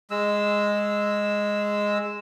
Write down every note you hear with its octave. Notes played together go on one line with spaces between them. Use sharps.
G#3 E6